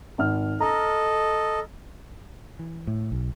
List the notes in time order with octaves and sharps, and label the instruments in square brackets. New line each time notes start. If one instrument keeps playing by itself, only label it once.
[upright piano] G#1 F6
[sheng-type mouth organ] A4 D#5 [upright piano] A#5
[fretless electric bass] E3
A2
B1